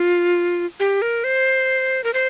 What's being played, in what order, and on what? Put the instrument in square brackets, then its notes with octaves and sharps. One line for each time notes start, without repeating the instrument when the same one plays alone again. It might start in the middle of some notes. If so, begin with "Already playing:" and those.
Already playing: [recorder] F4
G4
A#4
C5
A#4
C5